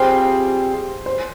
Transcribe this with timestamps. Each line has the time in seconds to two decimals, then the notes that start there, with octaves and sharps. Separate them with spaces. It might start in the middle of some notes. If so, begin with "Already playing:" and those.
Already playing: G3 C4 F4 G#4 C5
1.06 C5